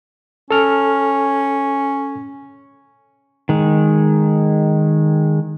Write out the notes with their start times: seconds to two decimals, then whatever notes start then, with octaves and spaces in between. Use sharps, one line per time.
0.51 C#4 A4 F6
3.49 D#3 G#3